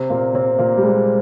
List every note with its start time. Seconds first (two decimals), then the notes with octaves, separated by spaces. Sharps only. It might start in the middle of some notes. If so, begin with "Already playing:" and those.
Already playing: C3 C4
0.10 A#2 A#3
0.34 C3 C4
0.59 A#2 A#3
0.77 G3
0.83 G#3